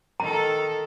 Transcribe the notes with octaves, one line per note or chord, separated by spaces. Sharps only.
D#3 A4 A#5